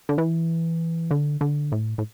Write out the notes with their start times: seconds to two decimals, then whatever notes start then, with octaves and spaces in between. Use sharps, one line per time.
0.09 D3
0.18 E3
1.11 D3
1.41 D3
1.72 A2
1.98 A2